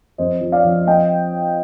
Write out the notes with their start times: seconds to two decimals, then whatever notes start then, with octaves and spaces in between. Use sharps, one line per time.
0.18 F2 C5 D#5
0.41 F3
0.52 D5 F5
0.65 F3
0.87 C4 D#5 G5